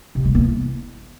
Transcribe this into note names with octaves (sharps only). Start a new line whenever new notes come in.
C3
G#3
B3
E4